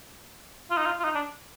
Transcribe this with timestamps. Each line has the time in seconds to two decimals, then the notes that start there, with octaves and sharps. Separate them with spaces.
0.71 F4
0.78 D#4
0.86 F4
0.99 F4
1.04 D#4
1.15 D4